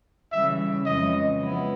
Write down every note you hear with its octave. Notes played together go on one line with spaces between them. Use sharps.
C#3 E3 G3 E5
F2 C#3 E3 G#3 D#5
F3 G#3 B3 E4